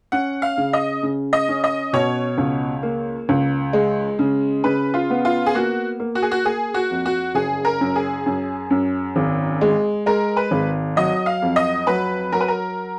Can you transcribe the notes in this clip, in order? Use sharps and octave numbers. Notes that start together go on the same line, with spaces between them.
C#4 F#5
F5
C#3
D#5
C#3
D#5
C#4
D#5
B2 C#5
C#2
A#3
C#2
G#3
C#3
C#3 B4
F4
B3
F4
G#4
A#3 F#4
A#3
F#4
G#4
F#4
A#3 G#4
F#4
F2
F#4
F#1 G#4
A#4
F#2
G#4
F#2
F#2
G#1
G#3
G#3 A#4
B4
G#1
F#3 D#5
F5
F2
D#5
F#3 B4
F#3 A#4
B4
A#4